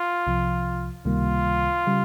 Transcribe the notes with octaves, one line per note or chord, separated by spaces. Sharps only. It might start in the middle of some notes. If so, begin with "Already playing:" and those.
Already playing: F4
C2 C3 F3
C#2 C3 D#3 G3 A#3 F4
C#3 G3